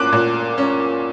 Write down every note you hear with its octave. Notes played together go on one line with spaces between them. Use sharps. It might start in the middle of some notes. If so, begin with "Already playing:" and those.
Already playing: A#2 A#3 C#4 D6 F#6
A#2
C#4